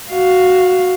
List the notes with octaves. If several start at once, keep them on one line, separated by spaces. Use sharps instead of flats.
F#4 F5